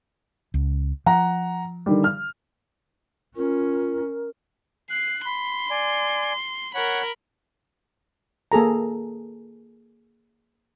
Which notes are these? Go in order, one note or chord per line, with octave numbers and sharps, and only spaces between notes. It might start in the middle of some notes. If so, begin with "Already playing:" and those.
C#2
F3 F#5 A#5
D3 D#3 G3
F6
C#4 F4 A#4
F#6 C7
B5 C6
D5 G#5
A#4 C#5 F#5 B5
A#3 G#4 A4 A#5